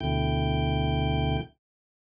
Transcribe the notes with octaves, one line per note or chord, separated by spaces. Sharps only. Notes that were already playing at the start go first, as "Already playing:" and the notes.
D2 B2 D3 E4 G5 G6